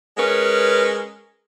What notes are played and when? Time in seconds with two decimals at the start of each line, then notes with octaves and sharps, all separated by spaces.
0.17 G#3 C#4 A#4 B4